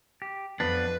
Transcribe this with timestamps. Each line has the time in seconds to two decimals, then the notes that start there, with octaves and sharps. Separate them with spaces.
0.22 G4
0.60 F2 F3 B3 D4 B4